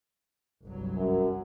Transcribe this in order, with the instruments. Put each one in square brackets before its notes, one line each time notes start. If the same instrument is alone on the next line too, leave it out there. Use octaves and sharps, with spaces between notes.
[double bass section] G1 C2 F#3
[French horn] F#2